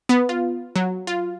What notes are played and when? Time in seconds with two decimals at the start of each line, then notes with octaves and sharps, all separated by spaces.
0.09 B3
0.29 F4
0.76 F#3
1.07 F4